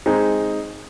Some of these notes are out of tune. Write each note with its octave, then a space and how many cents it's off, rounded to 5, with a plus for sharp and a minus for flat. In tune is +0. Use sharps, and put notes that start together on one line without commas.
G#3 +0 C4 +0 D#4 +0